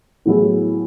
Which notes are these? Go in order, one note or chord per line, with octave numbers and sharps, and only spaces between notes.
A2 F#3 B3 E4 G#4